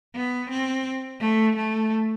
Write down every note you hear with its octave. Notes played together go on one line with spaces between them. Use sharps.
B3
C4
A3
A3